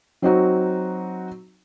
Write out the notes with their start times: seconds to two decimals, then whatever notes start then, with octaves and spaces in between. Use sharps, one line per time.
0.22 F#3 C4 D#4 F#4